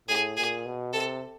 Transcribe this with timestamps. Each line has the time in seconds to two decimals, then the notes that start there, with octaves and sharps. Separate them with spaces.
0.08 A2 G#4
0.37 A#2 G#4
0.65 B2
0.93 C3 A4